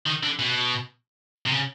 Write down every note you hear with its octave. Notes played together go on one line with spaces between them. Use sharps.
D#3
D3
B2
C3
C#3